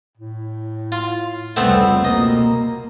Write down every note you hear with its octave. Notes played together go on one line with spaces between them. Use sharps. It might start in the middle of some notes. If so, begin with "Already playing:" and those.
A2
F4
F1 C#2 G3 A3 B3 C4
B2 A#3 D#5